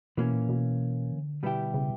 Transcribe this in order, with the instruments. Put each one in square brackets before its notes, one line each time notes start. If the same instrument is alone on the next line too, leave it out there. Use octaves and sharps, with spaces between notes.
[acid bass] B2 [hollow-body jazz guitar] E3 A#3 C#4
[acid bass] A#2
B2
D3
[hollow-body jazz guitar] B2 G3 B3 E4 G4
[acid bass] C#3